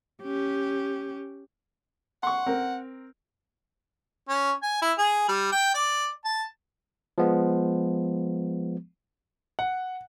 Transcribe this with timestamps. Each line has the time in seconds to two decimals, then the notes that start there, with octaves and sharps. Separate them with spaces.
0.23 C#4 G4
2.23 F#5 C6 C#6
2.47 C4 A#4
4.29 C#4
4.63 G#5
4.82 E4
4.98 G#4
5.29 G3
5.52 G5
5.74 D5
6.25 A5
7.18 F3 G#3 B3
9.59 F#5